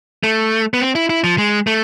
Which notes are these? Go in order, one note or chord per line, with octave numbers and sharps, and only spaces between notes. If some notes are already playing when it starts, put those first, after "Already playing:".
A3
B3
C4
E4
E4
F3
G#3
A3